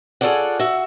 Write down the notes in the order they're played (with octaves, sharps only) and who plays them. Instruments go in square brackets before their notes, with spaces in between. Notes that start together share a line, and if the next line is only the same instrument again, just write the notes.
[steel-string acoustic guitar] F4 G#4 A4 C#5 D5 F#5
F#4 E5